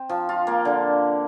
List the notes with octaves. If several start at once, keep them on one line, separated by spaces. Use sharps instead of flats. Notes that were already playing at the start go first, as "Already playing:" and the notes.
Already playing: C4
F3
F4
A#3
D3